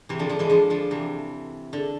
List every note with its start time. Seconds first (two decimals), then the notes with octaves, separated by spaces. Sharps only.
0.09 C3 E3
0.19 D3 F3
0.29 D3 F3
0.39 E3 G#3
0.50 D3 F3
0.70 D3 F3
0.91 C3 E3
1.73 D3